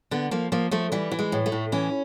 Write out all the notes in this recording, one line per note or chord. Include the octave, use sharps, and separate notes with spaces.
D3 B3
F3 A#3
F3 A#3
F3 A3
E3 G3
E3
G#3
A2
A3
A2
E3 C#4